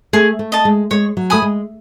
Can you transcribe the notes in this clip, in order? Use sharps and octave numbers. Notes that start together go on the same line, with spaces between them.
A3 G#4
A3
D#5 A5
G#3
G#3 C#5
F#3
A3 G#5 B5 D#6
G#3